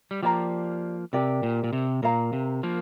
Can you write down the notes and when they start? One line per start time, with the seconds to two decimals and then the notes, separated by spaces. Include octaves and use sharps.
0.11 G3
0.22 F3 A#3 G4 D5 A#5
1.13 C3 G4 A#4 D5
1.43 A#2
1.64 A#2
1.73 C3
2.02 A#2 A#4 F5 A#5
2.33 C3
2.63 F3 A#3